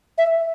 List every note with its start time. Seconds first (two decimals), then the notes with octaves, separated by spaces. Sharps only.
0.18 E5